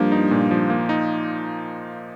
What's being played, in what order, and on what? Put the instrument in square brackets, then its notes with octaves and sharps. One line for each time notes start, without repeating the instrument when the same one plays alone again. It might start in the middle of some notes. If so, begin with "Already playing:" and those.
Already playing: [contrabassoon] G2 [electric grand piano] F3 A#3
[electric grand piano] D#4
A#2
F3
A#3
D#4